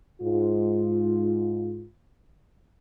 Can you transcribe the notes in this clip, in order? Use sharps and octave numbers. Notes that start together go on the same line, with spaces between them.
G#2 F4